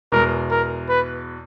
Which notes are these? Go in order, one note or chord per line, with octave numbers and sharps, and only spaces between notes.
E2 B2 G#3 A#4
A#4
B4